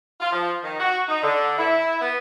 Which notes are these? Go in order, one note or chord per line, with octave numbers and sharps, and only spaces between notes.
F4
F3
D#3
F#4
D#4
D3
E4
B3